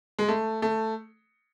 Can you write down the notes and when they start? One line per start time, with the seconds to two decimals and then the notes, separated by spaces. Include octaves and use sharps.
0.19 G#3
0.28 A3
0.62 A3